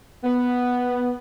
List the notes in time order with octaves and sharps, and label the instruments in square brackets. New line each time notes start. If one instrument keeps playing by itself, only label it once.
[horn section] B3